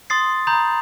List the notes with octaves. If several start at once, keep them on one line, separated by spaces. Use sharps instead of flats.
C6 D#6 A6 C7
A#5 B5 D#6 G6